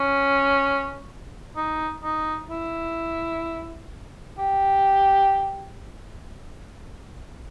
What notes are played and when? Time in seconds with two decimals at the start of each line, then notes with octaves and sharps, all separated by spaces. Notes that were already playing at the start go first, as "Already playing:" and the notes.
Already playing: C#4
1.56 D#4
2.04 D#4
2.50 E4
4.39 G4